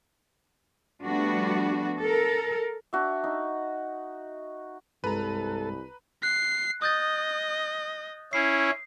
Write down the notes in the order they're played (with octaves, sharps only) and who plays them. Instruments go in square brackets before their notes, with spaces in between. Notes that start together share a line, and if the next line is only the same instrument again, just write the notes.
[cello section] F3 G3 A3 B3 D4 F#4
A4 A#4
[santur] D4 F#4 E5
D#4
[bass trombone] C2 [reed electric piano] G2 G#3 [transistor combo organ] A4 [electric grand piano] B4 A#5
[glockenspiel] F#6 [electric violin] C7
[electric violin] D#5 [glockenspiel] D#6 G6 A6
[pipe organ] C#4 E4 [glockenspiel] C7